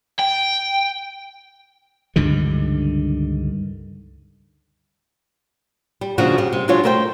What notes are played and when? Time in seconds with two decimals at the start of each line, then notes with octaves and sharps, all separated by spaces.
0.19 G5
2.16 C#2 G2 D3 D#3
6.01 G3
6.18 C#3 F3 A#3 D4 F#4
6.38 G2 C#3 G3
6.53 C3
6.68 F#3 G#3 D4 F4 F#4 C#5
6.83 A3 A#4 C5 E5 G5